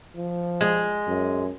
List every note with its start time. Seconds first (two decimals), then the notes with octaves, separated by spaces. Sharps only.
0.16 F3
0.61 G#3
1.07 F#2